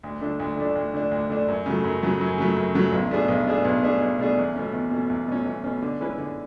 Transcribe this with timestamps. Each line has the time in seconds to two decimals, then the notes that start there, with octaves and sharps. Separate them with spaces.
0.03 D2
0.21 D3 A3 D4
0.40 D2
0.57 D3 A3 D4
0.76 D2
0.94 D3 A3 D4
1.11 D2
1.30 D3 A3 D4
1.48 F#2
1.66 C#3 F#3 A3
1.84 F#2
2.02 C#3 F#3 A3
2.21 F#2
2.38 C#3 F#3 A3
2.56 F#2
2.74 C#3 F#3 A3
2.92 B1
3.11 B2 A3 D4 G#4
3.28 B1
3.47 B2 A3 D4 G#4
3.65 B1
3.83 B2 A3 D4 G#4
4.01 B1
4.19 B2 A3 D4 G#4
4.38 E2
4.56 B2 A3 C#4
4.73 E2
4.91 B2 A3 C#4
5.10 E2
5.28 B2 A3 C#4
5.46 E2
5.64 B2 A3 C#4
5.82 D3
6.01 G#3 C#4 E4 B4
6.18 D3